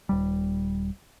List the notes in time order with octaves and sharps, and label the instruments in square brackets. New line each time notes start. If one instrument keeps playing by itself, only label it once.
[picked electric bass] D#1 G3